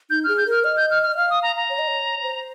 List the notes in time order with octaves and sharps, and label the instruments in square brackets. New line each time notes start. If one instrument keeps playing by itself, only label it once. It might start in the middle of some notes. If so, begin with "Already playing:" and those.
[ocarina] D#4 [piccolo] G6
[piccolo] F6
[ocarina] G#4
[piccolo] G6
[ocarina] A#4 [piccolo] F6
[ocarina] D#5 [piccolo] F6
[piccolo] G6
F6
F6
[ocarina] D#5
[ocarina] F5 [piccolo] F6
[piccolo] D#6
A#5
A#5
[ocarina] C#5
D#5
C#5
C5